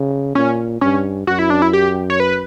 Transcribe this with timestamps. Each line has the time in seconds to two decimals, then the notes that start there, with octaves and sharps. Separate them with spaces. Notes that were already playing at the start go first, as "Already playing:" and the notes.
Already playing: C#3
0.35 A#2 C#4
0.81 G2 C#4
1.27 F#2 F#4
1.39 E4
1.50 D4
1.62 E4
1.73 G4
2.10 C#5
2.20 B4